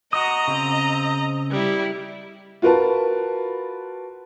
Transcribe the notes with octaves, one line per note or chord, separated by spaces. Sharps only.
F#4 D#5 A#5 D#6
C#3 C4
G3 E4
F4 F#4 A#4 B4 A5